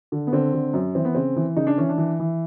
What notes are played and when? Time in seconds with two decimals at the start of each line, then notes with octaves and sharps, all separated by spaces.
0.12 D3
0.27 B3
0.32 D3 C4
0.53 D3
0.74 F#2
0.95 E3 C4
1.05 B3
1.15 C#3 C4
1.36 E3
1.56 C#3 D#4
1.67 D4
1.78 E3 C#4
1.89 D4
1.98 E3
2.20 E3